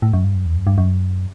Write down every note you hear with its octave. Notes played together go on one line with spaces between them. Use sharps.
A2
F#2
G2
F#2
E2
F#2
G2
F#2